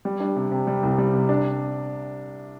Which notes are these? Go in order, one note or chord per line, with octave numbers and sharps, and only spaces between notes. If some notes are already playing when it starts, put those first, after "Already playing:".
G3
D4
C3
C3
G3
C2
G3
C3
D4